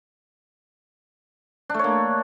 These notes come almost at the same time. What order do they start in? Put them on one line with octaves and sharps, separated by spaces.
D4 A3 C#5 A#3